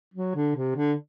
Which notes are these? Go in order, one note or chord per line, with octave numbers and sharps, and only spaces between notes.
F#3
D3
C3
D3